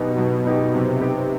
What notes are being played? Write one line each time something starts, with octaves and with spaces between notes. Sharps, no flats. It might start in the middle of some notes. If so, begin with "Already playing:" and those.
Already playing: B2 F#3 B3 D#4 G4
B2 F#3
B3 D#4 G4
C3 F#3
B3 D#4 G4